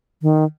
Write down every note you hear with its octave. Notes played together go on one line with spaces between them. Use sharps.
D#3